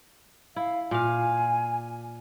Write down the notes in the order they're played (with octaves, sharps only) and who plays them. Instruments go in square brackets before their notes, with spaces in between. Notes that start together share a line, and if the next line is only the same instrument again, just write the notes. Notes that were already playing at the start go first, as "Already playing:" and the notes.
[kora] E4 [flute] F5
[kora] A#2 F5 [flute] G#5